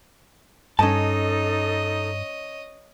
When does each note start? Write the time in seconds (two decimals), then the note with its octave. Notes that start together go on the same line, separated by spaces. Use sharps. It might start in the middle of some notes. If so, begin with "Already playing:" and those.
0.79 G2 C#4 D#4 A4 C#5 D#5 A5